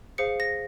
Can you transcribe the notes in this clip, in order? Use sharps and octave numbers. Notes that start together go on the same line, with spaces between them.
G#4 C5 F5 C#7
A#6